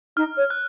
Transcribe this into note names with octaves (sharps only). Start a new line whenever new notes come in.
D#4 F6
C#5
F#6